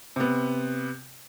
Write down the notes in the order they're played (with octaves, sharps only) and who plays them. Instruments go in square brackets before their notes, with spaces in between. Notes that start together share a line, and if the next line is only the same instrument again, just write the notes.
[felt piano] C3 B3